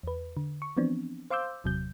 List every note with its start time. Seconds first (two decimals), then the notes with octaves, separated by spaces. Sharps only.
0.03 E2 B4
0.37 D3
0.62 C#6
0.77 E3 F3 B3 C4 D4
1.31 C5 F5 C6 D6 E6 G6
1.64 G1 E2 C3 F#3 G6